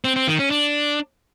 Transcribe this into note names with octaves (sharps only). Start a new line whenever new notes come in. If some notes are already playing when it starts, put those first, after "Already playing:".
C4
C4
D#3
C#4
D4